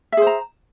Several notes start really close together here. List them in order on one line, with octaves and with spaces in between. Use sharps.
E5 G#4 C5 A#5